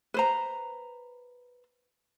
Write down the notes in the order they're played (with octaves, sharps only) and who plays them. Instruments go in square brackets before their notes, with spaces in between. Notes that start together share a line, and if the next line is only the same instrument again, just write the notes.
[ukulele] B4 C5 A#5